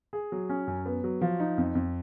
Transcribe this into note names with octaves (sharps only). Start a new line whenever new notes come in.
G#4
F#3
C#4
F#2
B3
F#3
F3
D#4
F2
F2